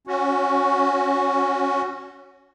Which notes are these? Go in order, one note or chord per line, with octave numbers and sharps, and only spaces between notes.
C#4 F#4